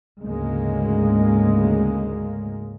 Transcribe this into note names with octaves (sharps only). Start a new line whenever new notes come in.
D2 G#2 C#3 G#3 A#3